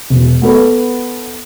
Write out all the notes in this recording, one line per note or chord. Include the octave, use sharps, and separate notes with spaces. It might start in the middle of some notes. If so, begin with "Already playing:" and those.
E1
B3 A4 B4